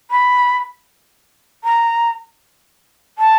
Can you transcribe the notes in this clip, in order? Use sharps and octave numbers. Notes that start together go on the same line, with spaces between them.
B5
A#5
A5